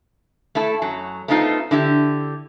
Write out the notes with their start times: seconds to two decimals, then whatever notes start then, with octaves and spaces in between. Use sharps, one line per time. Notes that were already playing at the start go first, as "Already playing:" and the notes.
0.55 A3 E4 A4
0.82 F#2 F#3
1.28 A3 B3 C4 D#4 F4 A4
1.71 D3 E4 G4